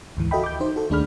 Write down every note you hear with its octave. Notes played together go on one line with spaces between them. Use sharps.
D2 G#2 E3
F#4 A4 D#5 E5 G5 B5
D6 G6
D#4 C5
F#4 A4
D#2 A3 D4 G#4 B5 F6